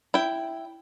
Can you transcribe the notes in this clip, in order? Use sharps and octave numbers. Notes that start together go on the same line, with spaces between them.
E4 G5